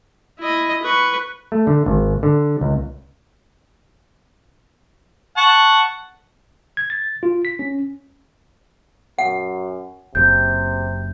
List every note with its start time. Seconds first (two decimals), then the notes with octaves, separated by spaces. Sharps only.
0.39 E4 D#5
0.82 B4 C#6
1.52 A3
1.67 D3
1.86 G#1
2.23 D3
2.61 C#2
5.37 F#5 A5 C#6
6.77 G#6
6.90 A6
7.23 F4
7.45 B6
7.59 C#4
9.18 F#2 F#5
10.15 F#1 C3 G6